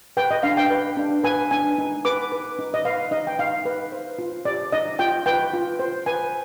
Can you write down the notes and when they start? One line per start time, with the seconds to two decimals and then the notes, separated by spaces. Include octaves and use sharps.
0.17 B4 G5
0.31 D#5
0.43 D4 F5
0.57 G5
0.70 B4
0.97 D4
1.24 B4 G#5
1.51 D4 G#5
1.78 D#4
2.05 B4 D6
2.32 B4
2.59 D#4
2.74 D#5
2.85 B4 F5
3.11 D#4 D#5
3.27 G5
3.39 D#4 F5
3.65 B4
3.92 C5
4.19 F4
4.45 C5 D5
4.72 D#4 D#5
4.99 F4 G5
5.26 B4 G5
5.53 F4
5.79 C5
6.06 B4 G#5